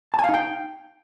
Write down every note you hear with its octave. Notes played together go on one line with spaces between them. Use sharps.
A5
G#5
F5
D#4
G5